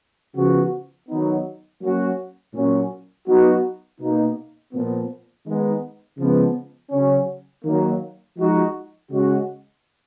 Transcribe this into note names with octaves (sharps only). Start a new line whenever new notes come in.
C#3 F3 B3 F#4
D#3 F#3 B3 D#4
F#3 A#3 C#4 F#4
A#2 F#3 C#4
F#3 B3 D#4 F#4
B2 A#3 D#4
A#2 F3 B3
D#3 G#3 B3 D#4
C#3 F3 G#3 B3
C#3 F#3 C#4
D#3 F#3 A#3
F3 G#3 D#4 F#4
C#3 G#3 C#4 F#4